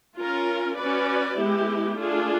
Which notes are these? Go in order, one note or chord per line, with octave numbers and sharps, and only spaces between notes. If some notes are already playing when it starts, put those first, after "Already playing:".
C#4 F4 A#4
C#4 F#4 B4 D5
G#3 B3 E4 G4
A3 D4 F4 G#4